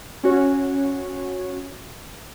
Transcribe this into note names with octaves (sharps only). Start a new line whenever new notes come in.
C#4 F#4 C#5